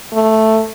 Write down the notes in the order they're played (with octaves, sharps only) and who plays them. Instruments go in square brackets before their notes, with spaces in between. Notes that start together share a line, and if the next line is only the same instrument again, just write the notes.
[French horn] A3